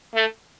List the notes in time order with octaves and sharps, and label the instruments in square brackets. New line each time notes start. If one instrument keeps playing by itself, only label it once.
[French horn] A3